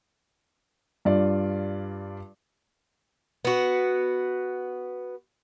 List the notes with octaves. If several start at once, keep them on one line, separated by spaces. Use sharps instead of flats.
G2 F4 D5
B3 F#4